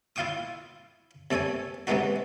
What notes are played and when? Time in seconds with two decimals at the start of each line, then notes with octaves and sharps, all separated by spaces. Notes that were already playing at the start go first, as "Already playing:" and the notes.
0.16 E4 F4 F5 G5 C#6 D#6
1.31 C3 A3 A4 C#5 G#5
1.87 C3 E3 G#3 A3 D#4 F#4